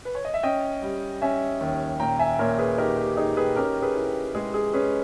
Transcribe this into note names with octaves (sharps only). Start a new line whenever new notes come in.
B4
C#5
D#5
E5
C#4 D#5 G5
G3
C#4 E5 G#5
D#2
A#2 G5 A#5
E5 G#5
A#2 A#4 C#5
G#4 B4
D#4 G4 A#4
G4
D#4 G#4
G#4 B4
C#4 G4 A#4
G#4 B4
E4
G#3 G#4
G#4
C#4 G#4 B4